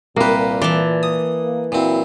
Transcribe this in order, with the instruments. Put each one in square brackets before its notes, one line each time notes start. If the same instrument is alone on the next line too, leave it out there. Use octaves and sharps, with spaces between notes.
[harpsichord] C2 G4 [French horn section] A#2 [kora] A#3 B4
[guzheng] E3 A5 [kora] D5
[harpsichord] D#6
[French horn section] A#3
[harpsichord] A#2 C4 [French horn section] F#3 E4